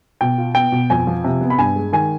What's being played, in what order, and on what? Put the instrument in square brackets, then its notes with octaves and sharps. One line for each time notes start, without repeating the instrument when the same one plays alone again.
[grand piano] B2 G5
F4
B3 G5
B2
F2 G#5
F3
C3
B3
B5
G2 G#5
G#3
D#3 G#5